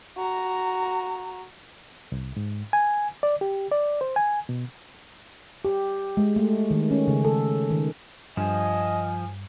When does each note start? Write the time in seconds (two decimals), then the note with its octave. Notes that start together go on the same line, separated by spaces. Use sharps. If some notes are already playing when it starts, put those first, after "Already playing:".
0.17 F#4 A#5
2.12 C2
2.37 G#2
2.73 G#5
3.23 D5
3.41 G4
3.71 D5
4.01 C5
4.16 G#5
4.49 B2
5.65 G4
6.17 G#3
6.36 A3
6.71 D#3
6.91 C#4
7.08 C#3
7.25 A4
7.71 D#3
8.37 G2 F3 D#5 G#5